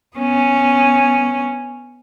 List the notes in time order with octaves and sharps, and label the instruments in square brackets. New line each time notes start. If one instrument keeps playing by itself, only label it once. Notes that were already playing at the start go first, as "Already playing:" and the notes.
[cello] B3 C#4